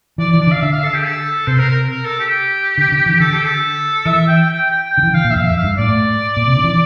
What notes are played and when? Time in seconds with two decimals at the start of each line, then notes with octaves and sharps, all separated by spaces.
0.18 E3 D5
0.30 D5
0.33 E3
0.40 D5
0.47 D3
0.51 F5
0.61 D3 E5
0.73 F5
0.84 A4
0.94 G4
1.05 A4
1.47 C3 C5
1.59 A#4
1.69 A#4
1.91 A#4
2.05 A4
2.20 G4
2.78 D3
2.92 D3
3.06 E3
3.20 D3 A4
3.33 G4
3.45 A4
4.06 E3 E5
4.27 G5
4.49 G5
4.70 G5
4.92 G5
4.98 D3
5.03 E3
5.14 D3 F5
5.24 A#2
5.30 E5
5.35 F2 F5
5.45 F2 E5
5.57 F5
5.63 G2
5.78 A2 D5
6.37 A#2
6.46 C3
6.56 D3
6.64 E3